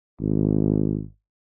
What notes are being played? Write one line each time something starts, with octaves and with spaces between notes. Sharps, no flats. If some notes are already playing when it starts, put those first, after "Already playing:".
G#1